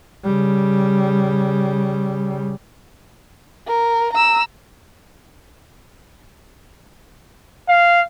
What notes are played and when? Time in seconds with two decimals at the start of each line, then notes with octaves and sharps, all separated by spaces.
0.24 C#3 G3
3.67 A#4
4.14 A#5 E6
7.68 F5